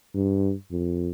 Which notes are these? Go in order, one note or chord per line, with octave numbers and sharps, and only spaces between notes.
G2
F2